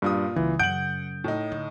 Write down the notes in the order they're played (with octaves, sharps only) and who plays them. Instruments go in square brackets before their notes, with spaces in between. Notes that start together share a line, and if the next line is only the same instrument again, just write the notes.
[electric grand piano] G2 [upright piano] A#2 F4 D#6
[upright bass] C#2 G3 [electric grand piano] E3
[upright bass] F#2 C#3 [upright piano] F#5 F#7 [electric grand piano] G6 D7
[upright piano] A2 D#4
[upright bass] D3